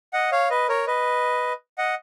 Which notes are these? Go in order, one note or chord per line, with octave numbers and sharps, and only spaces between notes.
D#5 F#5
C#5 F5
B4 D#5
A#4 C#5
B4 D#5
D#5 F#5